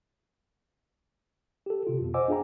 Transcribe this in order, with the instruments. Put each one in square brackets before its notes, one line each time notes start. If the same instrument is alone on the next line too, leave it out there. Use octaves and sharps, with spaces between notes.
[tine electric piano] G4 A4
C3 F4
F2 B2
C5 D#5 F#5 G#5 D6 E6
D4 F4 G#4 F5 G5 A#5